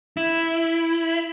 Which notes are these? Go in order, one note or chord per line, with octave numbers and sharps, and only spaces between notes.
E4